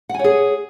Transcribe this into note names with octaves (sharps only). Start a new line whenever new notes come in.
G#4 C#5 F#5 G#5